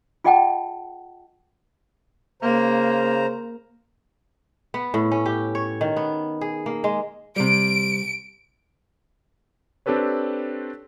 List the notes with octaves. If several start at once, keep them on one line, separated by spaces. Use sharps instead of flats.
F4 G#4 D#5 F#5 G5 A5
C#3 A#3 C5 A#5
B3
A2
C#4
G4
C#5
D#3
B3
G#4
A#3
G#3
C3 G3 D7
C4 D4 G4 A4 B4 C#5